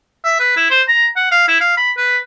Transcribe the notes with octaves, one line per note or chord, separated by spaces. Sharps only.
E5
B4
E4
C5
A#5
F#5
F5
E4
F5
B5
B4